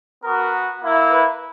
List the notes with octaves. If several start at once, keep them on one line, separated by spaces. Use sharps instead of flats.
B3 F#4 A#4
A#3 E4
B4